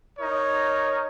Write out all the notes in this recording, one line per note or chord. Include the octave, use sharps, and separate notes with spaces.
D#4 A#4 C#5